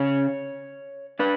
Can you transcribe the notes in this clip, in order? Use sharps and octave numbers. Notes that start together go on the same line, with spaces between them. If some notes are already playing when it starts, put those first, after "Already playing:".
Already playing: C#3 C#4 C#5
D4 B4